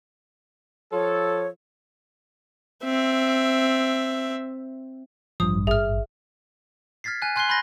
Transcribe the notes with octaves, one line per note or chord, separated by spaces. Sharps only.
F3 F4 A4 C#5
C4 E5
A1 G2 F3 D#6
G#1 G#4 E5 F6
F6 G#6 A6 B6 C7
G#5 F#6
G#5 C6 F#6 G#6 C7 G7
B5 C6 F#6 G6 A6 A#6